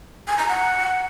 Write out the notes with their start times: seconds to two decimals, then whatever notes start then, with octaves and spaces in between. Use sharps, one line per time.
0.28 G#5
0.38 A#5
0.49 F#5